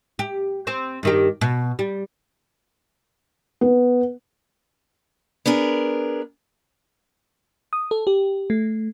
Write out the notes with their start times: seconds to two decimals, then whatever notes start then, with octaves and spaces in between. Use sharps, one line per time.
0.19 G4
0.67 C4 C5
1.03 G2 D#3 G4
1.41 B2
1.79 G3
3.61 B3
5.46 B3 D4 G#4 A#4
7.73 D#6
7.91 A4
8.07 G4
8.50 A3